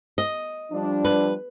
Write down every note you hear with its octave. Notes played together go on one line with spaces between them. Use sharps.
D#5
F3 G3 D4
B4